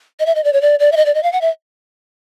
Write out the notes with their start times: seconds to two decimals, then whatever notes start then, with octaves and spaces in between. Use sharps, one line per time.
0.20 D#5
0.26 E5
0.35 D#5
0.44 D5
0.53 C#5
0.61 D5
0.80 D5
0.92 E5
0.97 D#5
1.06 D5
1.15 D#5
1.23 F5
1.32 F#5
1.41 E5